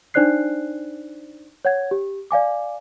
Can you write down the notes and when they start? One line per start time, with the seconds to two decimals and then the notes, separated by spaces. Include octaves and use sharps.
0.14 D4 D#4 C5 D5 F#6 C7
1.65 C#5 F#5 G#6
1.91 G4
2.31 D5 F5 G#5 D6